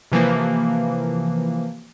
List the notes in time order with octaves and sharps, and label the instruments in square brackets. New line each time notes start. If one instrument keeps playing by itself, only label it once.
[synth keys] C3 E3 F3 A#3